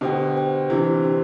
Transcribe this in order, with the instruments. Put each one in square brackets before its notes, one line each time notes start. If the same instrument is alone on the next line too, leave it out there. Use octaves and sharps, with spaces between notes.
[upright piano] B2 D3 [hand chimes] G4 C5 G5
[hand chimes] G4 C5 G5
[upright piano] C3 E3 [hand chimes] D4 G4 C5
[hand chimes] D4 G4 C5